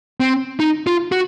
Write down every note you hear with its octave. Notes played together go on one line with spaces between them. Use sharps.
C4
D#4
F4
F#4